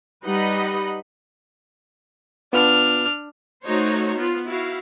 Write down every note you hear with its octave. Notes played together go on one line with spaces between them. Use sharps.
G3 D#4 B4 D#5 F#5 B5
B3 D4 F4 B4 F6
A3 D#4 F#4 C5 C#5
B3 F4
E4 F#4 F5